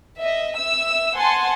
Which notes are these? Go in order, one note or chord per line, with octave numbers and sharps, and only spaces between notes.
D#5 E5
E5 E6
C5 F#5 G#5 A5 C6